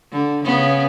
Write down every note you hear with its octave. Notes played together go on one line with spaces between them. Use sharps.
D3
C#3 B3